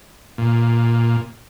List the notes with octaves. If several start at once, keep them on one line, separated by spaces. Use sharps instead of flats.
A#2